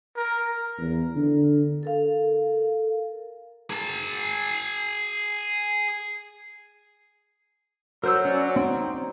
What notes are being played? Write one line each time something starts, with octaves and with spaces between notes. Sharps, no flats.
A#4
E2
D3
A4 A#4 F5
G#4 A5
F#3 A#4 C5 E6
C#4 D5
C4 D#4